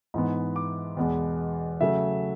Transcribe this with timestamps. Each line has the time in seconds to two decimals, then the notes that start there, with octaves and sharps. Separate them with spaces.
0.14 G#2 E3 B3
0.56 D6
0.97 E2 B2 G#3 B3
1.80 C#3 F#3 A3 E5